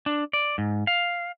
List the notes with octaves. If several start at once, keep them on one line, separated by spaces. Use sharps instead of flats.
D4
D5
G#2
F5